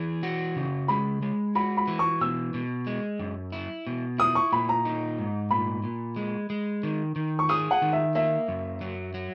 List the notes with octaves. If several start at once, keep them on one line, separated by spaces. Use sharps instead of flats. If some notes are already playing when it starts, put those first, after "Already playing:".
Already playing: E3 G#4
F#4
C#3
G#3 B5
G#3
F#4 B5
B5
E3
C#6
B2 E6
B2
G#3
F#2
E4
B2
E4 D#6
C#6
A#2 B5
A#5
D#4
G#2
A#2 B5
A#2
G#3
G#3
D#3
D#3
C#6
G#4 D#6
F#5
D#3
E5
A#3 E5
F#2
F#3
F#3